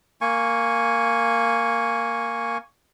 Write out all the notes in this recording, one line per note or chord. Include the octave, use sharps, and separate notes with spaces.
A#3 G#5 C#6